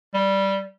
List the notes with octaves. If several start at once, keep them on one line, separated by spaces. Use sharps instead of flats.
G3